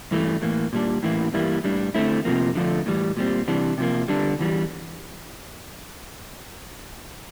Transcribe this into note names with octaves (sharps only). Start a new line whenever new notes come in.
G2 E3 A3
A2 E3 A#3
A#2 G3 D4
A2 E3 A#3 E4
G2 E3 G3 A#3 E4
A2 G3 D4
D3 A3 C4 E4
F2 C3 F3 A#3
D3 F3 A3 D4
A2 E3 G3
A#2 G3 C4
C3 E3 G3 D4
C3 F3 A#3
D3 G3 D4
E2 E3 G3